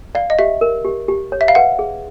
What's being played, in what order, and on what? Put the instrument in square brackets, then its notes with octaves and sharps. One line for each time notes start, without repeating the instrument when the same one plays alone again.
[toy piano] D5 [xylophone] F5
[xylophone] D#5
[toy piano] G4 [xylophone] E5
[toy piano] A#4
G4
G4
C#5
[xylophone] E5
F5
[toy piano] B4 [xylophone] F#5
[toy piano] G#4